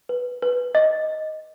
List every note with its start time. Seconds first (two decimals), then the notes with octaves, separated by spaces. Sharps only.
0.09 B4
0.42 B4
0.75 D#5